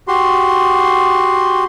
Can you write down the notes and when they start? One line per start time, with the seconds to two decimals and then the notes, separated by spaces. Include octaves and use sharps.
0.08 F#4 G4 C6